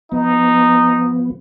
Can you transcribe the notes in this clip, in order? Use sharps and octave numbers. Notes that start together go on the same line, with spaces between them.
F3 B3 D#4